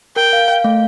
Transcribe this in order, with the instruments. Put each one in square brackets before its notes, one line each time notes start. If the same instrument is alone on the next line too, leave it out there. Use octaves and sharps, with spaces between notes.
[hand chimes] A#4 [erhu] G5
[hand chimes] F5
F5
A3